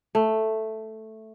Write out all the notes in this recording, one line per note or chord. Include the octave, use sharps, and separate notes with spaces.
A3